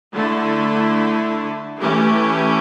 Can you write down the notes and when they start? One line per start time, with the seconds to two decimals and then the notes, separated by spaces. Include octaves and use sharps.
0.13 D3 A3 E4 A4
1.79 E3 A3 C#4 G4